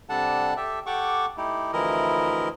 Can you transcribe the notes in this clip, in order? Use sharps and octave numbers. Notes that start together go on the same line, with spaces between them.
C3 G3 D4 A4 F#5 A5
G4 A4 E5
G4 A4 F#5 C#6 D6
A3 D#4 E4 G4
D2 E3 F3 E4 A#4 D#5